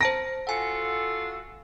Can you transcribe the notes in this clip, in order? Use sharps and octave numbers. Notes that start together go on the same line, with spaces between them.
C5 A5 A#5 A#6 D7
F4 F#4 A4 F#5 G#5